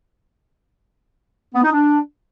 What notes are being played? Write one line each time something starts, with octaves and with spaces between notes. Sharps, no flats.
B3
D#4
D4